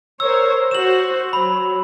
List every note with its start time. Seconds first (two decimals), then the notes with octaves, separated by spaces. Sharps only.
0.20 A#4 C5 C#5 E6
0.71 F#4 C5 E7 F#7
1.33 F#3 B5